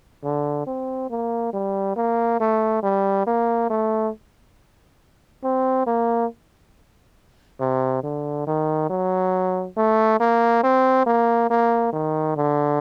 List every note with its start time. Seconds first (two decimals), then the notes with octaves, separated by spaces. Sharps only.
0.24 D3
0.67 C4
1.10 A#3
1.53 G3
1.97 A#3
2.40 A3
2.83 G3
3.27 A#3
3.70 A3
5.43 C4
5.87 A#3
7.60 C3
8.03 D3
8.47 D#3
8.90 F#3
9.77 A3
10.20 A#3
10.63 C4
11.06 A#3
11.50 A#3
11.93 D#3
12.36 D3